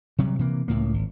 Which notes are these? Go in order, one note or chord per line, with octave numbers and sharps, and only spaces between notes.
C3 F#3 G3
C3 E3 A#3
C#2 A2 A#3
G#1